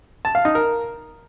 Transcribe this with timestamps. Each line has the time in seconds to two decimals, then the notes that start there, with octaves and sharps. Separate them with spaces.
0.25 A5
0.35 F5
0.45 D#4
0.55 A#4